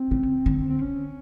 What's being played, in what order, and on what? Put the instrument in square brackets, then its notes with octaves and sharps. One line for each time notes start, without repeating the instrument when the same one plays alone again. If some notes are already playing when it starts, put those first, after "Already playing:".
Already playing: [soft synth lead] C4
[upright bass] C#3
D3
[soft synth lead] C4
C#4